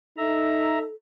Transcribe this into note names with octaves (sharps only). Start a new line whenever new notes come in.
D#4 A4 E5 A#5